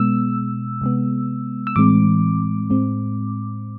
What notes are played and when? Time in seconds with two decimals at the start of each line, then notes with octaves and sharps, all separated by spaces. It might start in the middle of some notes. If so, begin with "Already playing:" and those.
Already playing: B2 G#3 B3 E6
0.82 C3 G#3 B3
1.67 E6
1.76 A2 E3 G#3 C4 D6
2.70 A2 G#3 C4